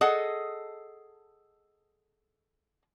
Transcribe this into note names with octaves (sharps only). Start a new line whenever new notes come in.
G#4 A4 D#5 F#5